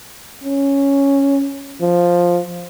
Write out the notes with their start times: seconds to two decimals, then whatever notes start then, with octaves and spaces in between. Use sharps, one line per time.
0.44 C#4
1.82 F3